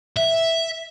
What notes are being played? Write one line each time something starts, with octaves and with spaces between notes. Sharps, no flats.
E5